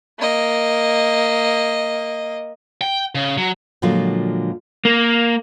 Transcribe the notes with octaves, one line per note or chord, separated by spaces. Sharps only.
A#3 D#5
G5
C#3
F#3
A#2 D3 F3 F#3 G#3 F4
A#3